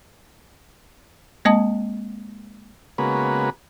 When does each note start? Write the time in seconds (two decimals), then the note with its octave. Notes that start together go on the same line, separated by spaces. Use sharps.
1.45 G#3 A#3 C4 D#5 A5 D#6
2.98 C#3 G#3 A#3 B3 F#4 B4